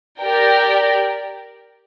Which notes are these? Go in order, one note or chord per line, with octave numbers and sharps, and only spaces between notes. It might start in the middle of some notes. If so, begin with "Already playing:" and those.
G4 A#4 D5 G5